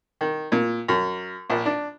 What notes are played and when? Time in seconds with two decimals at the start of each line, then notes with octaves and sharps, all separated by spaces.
0.21 D#3
0.52 A#2
0.88 F#2
1.50 A#1
1.66 D4